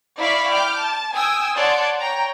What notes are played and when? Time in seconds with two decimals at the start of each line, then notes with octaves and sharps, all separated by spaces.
0.18 E4 D5 F5 B5 C#6 B6
0.51 G5 D6 F6 G6
0.81 A5
1.14 G5 G#5 D#6 E6
1.57 C#5 D5 F#5 A5 C6
1.99 C#5 G5 A#5